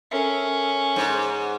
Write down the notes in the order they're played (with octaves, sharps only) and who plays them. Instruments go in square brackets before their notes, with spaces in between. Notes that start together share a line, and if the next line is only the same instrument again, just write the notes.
[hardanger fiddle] C#4 [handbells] A4 A#4 E5
[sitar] G#2